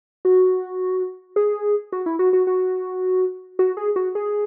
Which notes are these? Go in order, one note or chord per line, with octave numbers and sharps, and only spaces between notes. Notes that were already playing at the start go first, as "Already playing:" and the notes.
F#4
G#4
F#4
E4
F#4
F#4
F#4
F#4
G#4
F#4
G#4